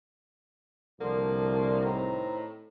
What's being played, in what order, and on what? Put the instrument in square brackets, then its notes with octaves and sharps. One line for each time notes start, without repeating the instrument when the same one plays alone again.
[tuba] C2 [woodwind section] D3 F3 [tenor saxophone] A#3
[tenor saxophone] A2 [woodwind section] D#3 C4 A#5